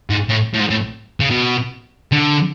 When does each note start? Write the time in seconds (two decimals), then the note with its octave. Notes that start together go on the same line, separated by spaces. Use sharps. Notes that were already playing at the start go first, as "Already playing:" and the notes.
0.10 G#2
0.29 A2
0.54 A2
0.60 G#2
0.70 A2
1.20 C#3
1.31 B2
2.12 D3